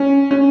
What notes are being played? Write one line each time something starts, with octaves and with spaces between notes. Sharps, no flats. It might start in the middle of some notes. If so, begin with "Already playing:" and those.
Already playing: C#4
C#4